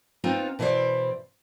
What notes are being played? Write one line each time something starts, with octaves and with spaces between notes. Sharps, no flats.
B3 C4 D#4 F4
B2 E3 E4 B4 C5 D5